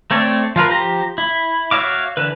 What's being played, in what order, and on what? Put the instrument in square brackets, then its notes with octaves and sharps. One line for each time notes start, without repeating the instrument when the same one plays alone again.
[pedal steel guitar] A3 C4 C#5 D5
F3 F4 A#4 B4
F3 G4 A#5
E4
F#4 C#5 E5 F5 D6
D3 E3 B4